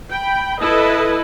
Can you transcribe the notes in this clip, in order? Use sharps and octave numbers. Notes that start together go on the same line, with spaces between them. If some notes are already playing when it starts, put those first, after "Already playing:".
G5 B5
E4 A4 B4 D#5